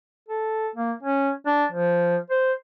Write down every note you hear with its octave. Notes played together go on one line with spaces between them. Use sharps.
A4
A#3
C#4
D4
F3
C5